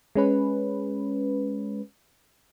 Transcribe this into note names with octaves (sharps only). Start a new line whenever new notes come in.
G#3 C#4 B4